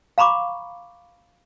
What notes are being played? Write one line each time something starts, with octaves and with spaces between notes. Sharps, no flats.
F5 A#5 B5 C#6 D6